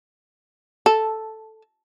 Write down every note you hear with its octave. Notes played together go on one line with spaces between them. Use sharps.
A4